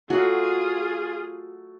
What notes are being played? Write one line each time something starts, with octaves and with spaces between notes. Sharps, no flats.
F#3 A3 F4 F#4 G#4